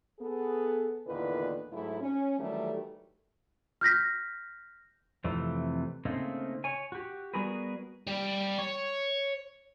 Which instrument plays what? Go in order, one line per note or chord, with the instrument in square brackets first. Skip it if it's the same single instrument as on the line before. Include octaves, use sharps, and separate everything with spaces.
[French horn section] B3 G#4 A4
E2 A#2 D3 D#3 E4 B4
G#2 F#3 A3 E4
C#4
D#3 E3 F#3 G3 A3
[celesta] F6 G6 A#6 B6
[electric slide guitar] F2 C3 E3 A3
C#3 A3 A#3 C4 D#4
C#5 G#5
F#4 G4
G3 B3 F#4 G#4 A#4 B4
[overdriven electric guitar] G3 G4
C#5